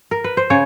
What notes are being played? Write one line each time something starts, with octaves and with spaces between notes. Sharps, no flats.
A#4
B4
C5
C#3 C#5